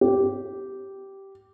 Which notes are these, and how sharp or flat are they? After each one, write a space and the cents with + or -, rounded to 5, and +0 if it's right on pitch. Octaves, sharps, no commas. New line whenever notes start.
G4 -10